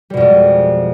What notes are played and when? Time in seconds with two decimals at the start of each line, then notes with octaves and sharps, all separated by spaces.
0.10 G3
0.14 B2
0.17 F2
0.20 G#3